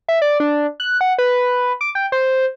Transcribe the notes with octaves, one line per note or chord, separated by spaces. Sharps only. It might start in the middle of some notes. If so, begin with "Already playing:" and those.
E5
D5
D4
F#6
F#5
B4
D6
G5
C5